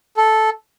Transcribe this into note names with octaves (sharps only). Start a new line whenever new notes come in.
A4